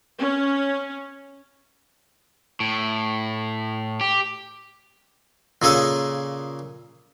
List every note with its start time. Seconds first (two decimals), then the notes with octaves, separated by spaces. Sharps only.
0.19 C#4
2.60 A2
4.01 G4
5.62 A#2 C#3 G#4 A4